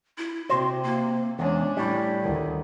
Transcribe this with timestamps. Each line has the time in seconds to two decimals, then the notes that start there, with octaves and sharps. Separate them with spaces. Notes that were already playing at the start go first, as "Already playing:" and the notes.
0.18 E4
0.49 C3 F#4 C5
0.83 A#3
1.39 E2 G#3 C#4 D4
1.77 A2 G3 E4
2.21 D2 D#3